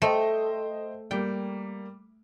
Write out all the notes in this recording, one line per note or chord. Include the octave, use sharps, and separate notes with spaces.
A3 C5 D#5 G5
G3 A#3 G5